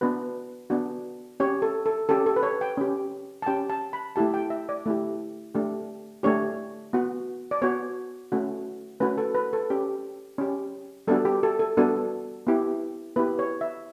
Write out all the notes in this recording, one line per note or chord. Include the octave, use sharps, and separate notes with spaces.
B3 D4 F#4 B4
B3 D4 F#4
C#4 G4 C#5
A4
A4
C#4 G4 A4
A4
B4
C#5
G5
C#4 G4
A5
C#4 G4 G5
A5
B5
A3 E4 G4 A5
G5
E5
D5
A3 E4 G4
A3 D4 G4
A3 D4 G4 C#5
B3 F#4
D5
B3 F#4 C#5
A3 C#4 F#4
A3 C#4 F#4 B4
A4
B4
A4
C#4 G4
C#4 G4
G3 B3 D4 F#4 A4
G4
A4
A4
G3 B3 D4 F#4 A4
B3 E4 G4
B3 E4 G4 B4
C#5
E5